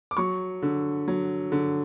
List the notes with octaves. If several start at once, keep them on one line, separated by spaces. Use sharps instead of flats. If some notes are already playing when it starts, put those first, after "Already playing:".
D6
F#3 C#6
D3
F#3
D3